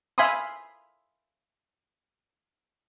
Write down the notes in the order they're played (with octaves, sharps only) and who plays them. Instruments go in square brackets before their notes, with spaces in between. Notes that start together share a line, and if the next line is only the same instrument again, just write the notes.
[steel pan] E5 F5 G#5 B5 C6 D#6